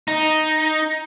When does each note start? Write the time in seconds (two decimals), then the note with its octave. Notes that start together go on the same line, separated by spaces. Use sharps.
0.08 D#4